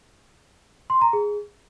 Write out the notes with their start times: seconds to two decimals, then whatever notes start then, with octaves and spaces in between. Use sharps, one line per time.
0.90 C6
1.01 A#5
1.13 G#4